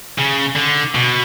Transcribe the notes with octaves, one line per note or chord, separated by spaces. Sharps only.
C#3
D3
B2